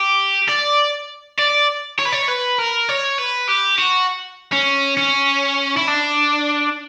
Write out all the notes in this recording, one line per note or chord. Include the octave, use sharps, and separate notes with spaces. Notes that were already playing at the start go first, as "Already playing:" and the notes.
Already playing: G4
D5
D5
C#5
B4
C#5
B4
A#4
C#5
B4
G4
F#4
C#4
C#4
E4
D4